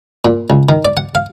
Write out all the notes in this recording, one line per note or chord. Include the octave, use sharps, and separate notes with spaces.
A#2
C#2
D#3
D5
F#5
F5